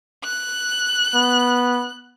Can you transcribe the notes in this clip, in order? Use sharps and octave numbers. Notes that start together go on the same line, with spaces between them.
F#6
B3